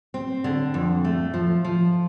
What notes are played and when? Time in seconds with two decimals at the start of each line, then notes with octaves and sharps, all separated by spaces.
0.14 C4
0.44 D3
0.74 F2
1.04 A3
1.34 F3
1.64 F3